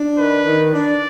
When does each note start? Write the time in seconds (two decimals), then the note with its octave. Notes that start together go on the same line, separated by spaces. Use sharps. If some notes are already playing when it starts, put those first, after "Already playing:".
Already playing: D4
0.18 D#3 B4
0.46 D#3
0.73 D4 D5